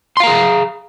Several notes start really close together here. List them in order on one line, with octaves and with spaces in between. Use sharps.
C6 F5 A#5 G#4